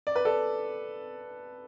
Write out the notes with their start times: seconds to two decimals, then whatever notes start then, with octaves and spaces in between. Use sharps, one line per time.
0.07 D5
0.16 B4
0.25 A4 D5